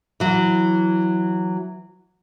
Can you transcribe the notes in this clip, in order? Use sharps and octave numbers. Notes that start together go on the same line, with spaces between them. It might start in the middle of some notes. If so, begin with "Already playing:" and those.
E3 F#3